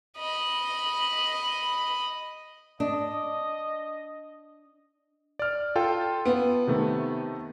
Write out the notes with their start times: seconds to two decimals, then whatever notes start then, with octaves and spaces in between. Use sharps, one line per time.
0.18 D#5 B5
2.80 D4 D#5
5.39 D5 F6
5.76 F4 A4 G5
6.25 B3
6.67 C3 D#3 A3